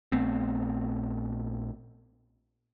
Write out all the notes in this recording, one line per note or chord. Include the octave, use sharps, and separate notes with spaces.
A#1 A3 B3 C4